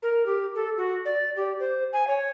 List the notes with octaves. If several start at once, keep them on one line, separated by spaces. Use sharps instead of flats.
A#4
G4
A4
F#4
D5
G4
C5
G#5
C#5